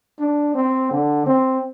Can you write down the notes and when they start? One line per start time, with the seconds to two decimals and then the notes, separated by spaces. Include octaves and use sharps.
0.19 D4
0.55 C4
0.91 D3
1.26 C4